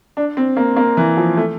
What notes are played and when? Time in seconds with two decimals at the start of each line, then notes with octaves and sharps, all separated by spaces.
0.17 D4
0.37 C4
0.57 A#3
0.77 A#3
0.97 E3
1.17 F3
1.37 A3